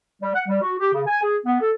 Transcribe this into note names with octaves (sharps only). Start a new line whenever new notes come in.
G3
F#5
G3
F#4
G4
C#3
G#5
G#4
B3
A4